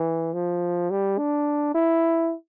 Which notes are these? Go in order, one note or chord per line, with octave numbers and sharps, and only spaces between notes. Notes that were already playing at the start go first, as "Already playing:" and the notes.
Already playing: E3
F3
G3
D4
E4